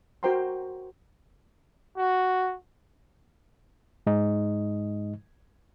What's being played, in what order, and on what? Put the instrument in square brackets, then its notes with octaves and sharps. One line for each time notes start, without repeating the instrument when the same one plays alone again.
[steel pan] F#4 A#4 C5 G5 A#5 C6
[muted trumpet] F#4
[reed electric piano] G#2 G#3 D#4 D#5